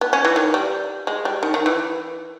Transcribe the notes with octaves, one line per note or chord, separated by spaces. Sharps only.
B3
C#4
E3
D#3
G3
G#3
G3
D#3
D#3
E3